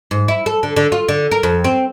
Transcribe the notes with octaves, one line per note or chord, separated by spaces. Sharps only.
G#2
E4
A4
D3
D3
F4
D3
A#4
F2
C4